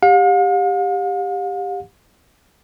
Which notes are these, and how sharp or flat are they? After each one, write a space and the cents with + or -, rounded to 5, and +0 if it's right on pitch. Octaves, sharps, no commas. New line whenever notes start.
G4 +15 F5 +45